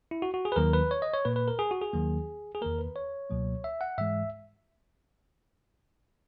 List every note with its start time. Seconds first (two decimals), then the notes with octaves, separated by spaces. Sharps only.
0.11 E4
0.22 F#4
0.34 F#4
0.45 G#4
0.52 B4
0.56 D#2 D#3 F#3 A#3 A#4
0.73 B4
0.91 C#5
1.02 D#5
1.14 C#5
1.25 A#2 A#3 B4
1.36 B4
1.48 A#4
1.59 G#4
1.71 F#4
1.81 G#4
1.93 D#2 D#3 F#3 A#3
2.55 G#4
2.61 E2 D#3 A#3 A#4
2.79 B4
2.96 C#5
3.30 C#2 B2 F#3 A#3
3.64 E5
3.81 F#5
3.98 G#2 E3 G#3 E5